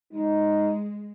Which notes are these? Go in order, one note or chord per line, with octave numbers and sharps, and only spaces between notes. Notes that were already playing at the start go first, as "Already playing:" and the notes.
G#3 D#4